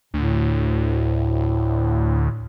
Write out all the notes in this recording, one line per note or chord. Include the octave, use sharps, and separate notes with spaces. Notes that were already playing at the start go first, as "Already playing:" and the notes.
D2 A2